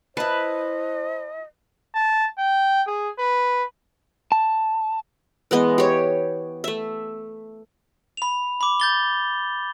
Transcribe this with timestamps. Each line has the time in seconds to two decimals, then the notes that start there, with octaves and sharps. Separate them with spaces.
0.17 E4 B4 C5 D#5 A5
1.95 A5
2.38 G5
2.87 G#4
3.19 B4
4.32 A5
5.51 E3 G#3 B3 D#5
5.78 G4 C#5
6.64 A3 E5
8.17 B5 F7
8.61 B5 D6
8.80 G6 A6 G7